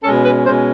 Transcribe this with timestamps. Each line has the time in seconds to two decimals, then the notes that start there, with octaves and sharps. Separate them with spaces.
0.03 B2 G#3 C#4 A4
0.23 B4
0.45 B2 G#3 C#4 C5